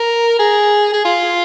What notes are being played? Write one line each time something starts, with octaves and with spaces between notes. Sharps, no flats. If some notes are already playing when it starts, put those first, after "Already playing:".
Already playing: A#4
G#4
G#4
F4